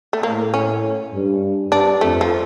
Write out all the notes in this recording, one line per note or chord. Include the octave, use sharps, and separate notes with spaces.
A3
A2 A#3
C#4
G2
G2 D4
F2 A3
F3